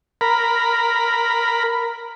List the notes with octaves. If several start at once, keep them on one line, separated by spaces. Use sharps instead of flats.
A#4 B5